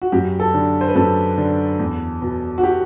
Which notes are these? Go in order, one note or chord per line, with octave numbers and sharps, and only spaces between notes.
F#4
F#2 G4
A4
D3
C5
B4
F#2 A4
D3
E2
B2
F#4
G4